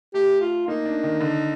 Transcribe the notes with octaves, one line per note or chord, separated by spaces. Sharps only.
A3 G4
F4
A#3 D#4
D4
D#3
D3